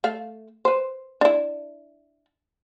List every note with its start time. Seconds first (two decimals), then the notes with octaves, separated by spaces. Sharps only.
0.04 A3 F5
0.65 B4 C5
1.21 D4 E4